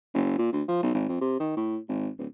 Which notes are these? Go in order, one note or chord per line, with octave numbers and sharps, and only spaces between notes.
F#1
A#2
D2
F3
B1
G#1
F2
C3
D#3
A2
G#1
D1